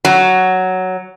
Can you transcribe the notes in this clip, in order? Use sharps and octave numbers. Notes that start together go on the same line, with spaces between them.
F#3